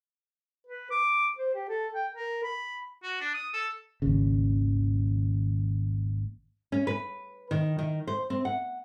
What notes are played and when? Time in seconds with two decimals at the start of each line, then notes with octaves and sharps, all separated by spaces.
0.67 B4
0.90 D6
1.38 C5
1.54 G4
1.68 A4
1.94 G5
2.12 A#4
2.43 B5
3.03 F#4
3.21 D4
3.34 D#6
3.54 A4
4.02 G#1 D#2 C#3
6.72 C#4
6.87 B4
7.51 D#3
7.79 D#3
8.07 C5
8.30 C4
8.45 F#5